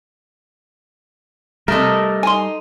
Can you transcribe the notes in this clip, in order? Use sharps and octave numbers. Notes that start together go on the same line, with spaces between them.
C3 G3 A3 A#4 D#5
D#4 G#5 C6